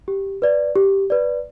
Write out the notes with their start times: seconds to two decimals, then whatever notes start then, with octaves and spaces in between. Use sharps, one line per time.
0.08 G4
0.42 B4 D5
0.76 G4
1.10 B4 D5